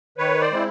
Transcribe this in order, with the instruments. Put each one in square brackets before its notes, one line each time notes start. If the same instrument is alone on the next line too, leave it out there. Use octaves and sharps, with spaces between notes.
[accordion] D#3 B4 C#5
C5 D5
G#3 C4 E4